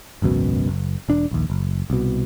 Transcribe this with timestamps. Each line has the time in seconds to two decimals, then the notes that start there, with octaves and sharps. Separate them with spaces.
0.22 G#1 C#2 F#2 B2
0.67 F#1
1.09 E1 D4
1.31 A#1 D#2
1.50 F#1
1.90 C2 B2